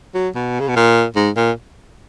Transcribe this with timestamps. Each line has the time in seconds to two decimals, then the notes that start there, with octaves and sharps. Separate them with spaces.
0.15 F#3
0.35 B2
0.60 C#3
0.68 B2
0.76 A#2
1.16 G#2
1.37 A#2